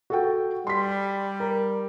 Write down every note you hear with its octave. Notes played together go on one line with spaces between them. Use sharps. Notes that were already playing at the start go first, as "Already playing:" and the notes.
F#4 A4 G5
G3 C6 B6
A#4